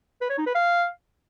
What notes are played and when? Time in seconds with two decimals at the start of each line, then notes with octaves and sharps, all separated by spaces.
0.21 B4
0.30 C#5
0.38 D#4
0.47 B4
0.55 F5